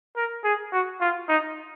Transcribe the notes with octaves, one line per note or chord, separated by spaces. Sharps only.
A#4
G#4
F#4
F4
D#4